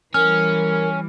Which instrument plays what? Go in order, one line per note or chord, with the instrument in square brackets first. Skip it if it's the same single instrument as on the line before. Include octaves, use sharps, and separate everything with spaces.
[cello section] E3 G3 [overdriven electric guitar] C#4 [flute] A#4 [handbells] F6